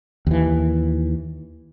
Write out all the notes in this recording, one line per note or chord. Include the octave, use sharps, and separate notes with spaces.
D#2 E3